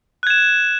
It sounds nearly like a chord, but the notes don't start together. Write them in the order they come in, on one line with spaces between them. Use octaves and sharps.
F#6 G#6 E7